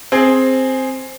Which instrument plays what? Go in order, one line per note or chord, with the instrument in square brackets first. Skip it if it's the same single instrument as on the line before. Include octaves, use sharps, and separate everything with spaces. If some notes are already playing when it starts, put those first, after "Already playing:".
[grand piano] C4 G#4